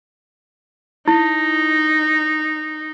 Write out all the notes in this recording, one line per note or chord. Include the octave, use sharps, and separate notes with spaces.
D#4 E4